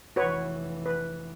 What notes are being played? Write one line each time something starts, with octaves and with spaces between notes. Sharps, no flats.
F1 E3 F#4 B4 C#5
B4